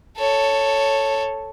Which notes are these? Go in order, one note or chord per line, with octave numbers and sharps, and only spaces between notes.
A4 C#5